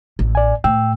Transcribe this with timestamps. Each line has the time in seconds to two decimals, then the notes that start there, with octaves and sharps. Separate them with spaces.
0.19 A1
0.35 D5 G#5
0.64 A2 G5 E6